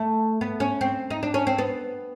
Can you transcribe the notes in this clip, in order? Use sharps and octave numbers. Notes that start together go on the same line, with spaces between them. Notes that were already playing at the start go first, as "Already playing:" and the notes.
Already playing: A3
B3
C#4
C4
D#4
D4
C#4
C4
B3